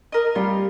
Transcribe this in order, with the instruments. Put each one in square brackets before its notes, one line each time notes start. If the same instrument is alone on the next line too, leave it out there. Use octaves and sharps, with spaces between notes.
[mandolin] A#4 D#5
[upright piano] G3 [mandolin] F4